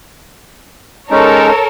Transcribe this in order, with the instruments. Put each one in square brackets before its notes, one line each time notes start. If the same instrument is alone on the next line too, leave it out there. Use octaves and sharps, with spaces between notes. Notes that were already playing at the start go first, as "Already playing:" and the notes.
[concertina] G#3 C#4 D#4 [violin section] A4 A#4 C#5